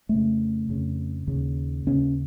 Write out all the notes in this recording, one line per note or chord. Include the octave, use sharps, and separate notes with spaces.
F2 A3
C#3
F2 C#3
D#2 C#3
D#2 C#3 C#4